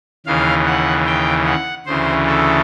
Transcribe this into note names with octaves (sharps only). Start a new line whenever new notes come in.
D#2 C#3 E3 F5
F#5
G5
F#5
D2 C#3 E3 C5
A4